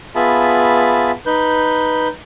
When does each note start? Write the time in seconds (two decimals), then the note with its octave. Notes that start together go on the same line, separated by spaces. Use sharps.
0.15 B3 F4 G#4 E5 A5 B5
1.26 D#4 B4 G6